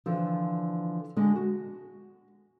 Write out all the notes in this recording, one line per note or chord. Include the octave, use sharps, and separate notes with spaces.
D3 E3 F3
D3 G#3 F#4
F#4